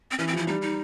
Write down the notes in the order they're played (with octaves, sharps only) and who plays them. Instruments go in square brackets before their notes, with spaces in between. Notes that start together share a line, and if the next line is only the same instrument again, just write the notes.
[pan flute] C4
[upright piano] E3 [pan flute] C#4
[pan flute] C4
[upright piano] F3 [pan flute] E4
[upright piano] G3 [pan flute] D#4
[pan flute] D#4